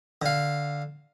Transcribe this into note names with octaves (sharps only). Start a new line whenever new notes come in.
D3 F5